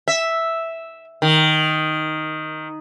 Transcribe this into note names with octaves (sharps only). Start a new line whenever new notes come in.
E5
D#3